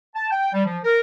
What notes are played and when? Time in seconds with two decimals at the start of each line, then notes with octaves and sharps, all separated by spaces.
0.15 A5
0.31 G5
0.53 G3
0.65 F3
0.84 A#4